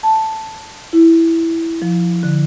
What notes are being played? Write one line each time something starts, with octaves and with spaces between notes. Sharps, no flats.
A5
E4
F3
D3